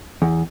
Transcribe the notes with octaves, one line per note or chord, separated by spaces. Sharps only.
E2